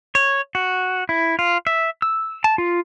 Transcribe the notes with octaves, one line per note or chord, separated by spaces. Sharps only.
C#5
F#4
E4
F4
E5
E6
A5
F4